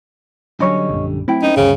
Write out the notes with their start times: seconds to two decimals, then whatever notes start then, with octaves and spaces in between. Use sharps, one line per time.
0.60 D3 F#3 G3 C#4 D4 C#5 D#5 B5
0.89 A#1 F#2
1.28 F#3 A3 C4 E4 G5
1.43 C#4 D#4 A#4 C5
1.56 G1 D2 G2 C#3